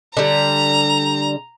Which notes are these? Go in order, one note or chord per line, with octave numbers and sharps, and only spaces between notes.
D3 G3 A#5